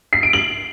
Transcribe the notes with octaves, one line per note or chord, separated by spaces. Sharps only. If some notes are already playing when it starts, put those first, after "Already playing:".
C7
D7
F#7